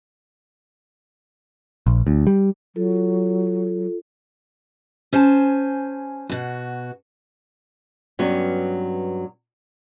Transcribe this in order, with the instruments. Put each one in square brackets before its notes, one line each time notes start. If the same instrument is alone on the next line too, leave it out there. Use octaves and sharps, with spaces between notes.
[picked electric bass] A#1
D2
G3
[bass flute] F#3 [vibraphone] F4 A4
[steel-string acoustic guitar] C#4 C5 G#5 A5
B2 F#4
[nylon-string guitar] G2 F#3 B3 C#4